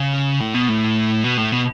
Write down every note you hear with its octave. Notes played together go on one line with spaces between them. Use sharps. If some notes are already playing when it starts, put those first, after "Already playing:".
Already playing: C#3
A2
B2
A2
B2
A2
B2